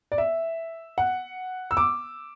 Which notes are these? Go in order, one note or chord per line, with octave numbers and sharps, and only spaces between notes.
D5
E5
F#5
E6
D6